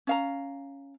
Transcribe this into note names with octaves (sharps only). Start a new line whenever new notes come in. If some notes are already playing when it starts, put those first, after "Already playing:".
C#4 F5 A#5